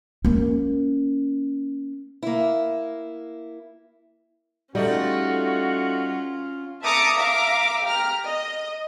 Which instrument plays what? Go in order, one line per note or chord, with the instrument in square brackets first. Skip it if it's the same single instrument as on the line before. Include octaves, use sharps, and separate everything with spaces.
[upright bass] A#3 C#4
[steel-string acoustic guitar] A#3 E4
[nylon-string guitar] G3 [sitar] A3 D#4 [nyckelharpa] C#4 F4 [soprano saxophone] F#4
[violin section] E5 A5 A#5 D6 D#6 C#7
E5 F5 A#5 D6
G4 A#5 F6
D#5